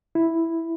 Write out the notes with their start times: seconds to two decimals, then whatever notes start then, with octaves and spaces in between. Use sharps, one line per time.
0.15 E4